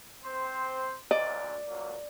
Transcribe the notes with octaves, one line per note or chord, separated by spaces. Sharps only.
C4 C5
D2 A#2 D5 D#5
C#2 F#3 A#3